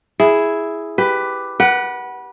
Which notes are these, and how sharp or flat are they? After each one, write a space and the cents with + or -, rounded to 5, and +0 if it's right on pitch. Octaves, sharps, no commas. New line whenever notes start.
E4 +0 G#4 +0
G4 +0 B4 +10
B4 -25 F#5 +15